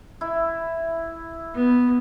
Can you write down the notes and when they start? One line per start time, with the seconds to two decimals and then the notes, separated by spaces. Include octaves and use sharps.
0.21 E4
1.54 B3